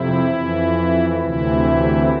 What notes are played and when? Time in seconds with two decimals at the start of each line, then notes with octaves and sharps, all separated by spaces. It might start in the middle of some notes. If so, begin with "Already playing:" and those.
Already playing: F2 C3 E4
0.27 F2 E3
1.19 D2 C3 E3 E4